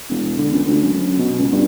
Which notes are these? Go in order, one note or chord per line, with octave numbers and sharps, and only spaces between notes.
E1
D3
C#2
D2
F#2
B2
C#2
G2